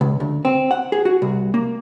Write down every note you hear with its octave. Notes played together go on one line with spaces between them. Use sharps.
C#2
D2
C4
F#5
G#4
F#4
C2
A#3